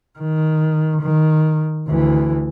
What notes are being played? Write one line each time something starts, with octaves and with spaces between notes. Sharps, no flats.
D#3
D#3
D2 E3